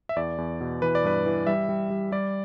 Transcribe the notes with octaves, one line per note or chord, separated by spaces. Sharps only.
E5
E2 D5
E2
B2
E3 B4
D5
G2 B4
E3
G3 E5
G3
G3
G3 D5